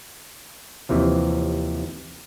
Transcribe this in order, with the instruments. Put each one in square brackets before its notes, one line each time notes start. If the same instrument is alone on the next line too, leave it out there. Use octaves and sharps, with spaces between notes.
[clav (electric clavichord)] D#2 C3 E3 F3